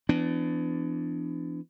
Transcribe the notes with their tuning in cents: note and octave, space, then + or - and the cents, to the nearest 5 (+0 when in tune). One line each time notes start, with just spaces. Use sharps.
E3 +35 B3 +35 D4 +0